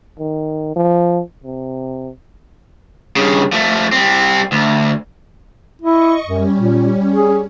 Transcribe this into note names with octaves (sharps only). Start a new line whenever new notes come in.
D#3
F3
C3
G2 C#3
F3 A3
G3 C4
D2
E4 D#5 C#6
F#2 G3 C#4
A#2
G#4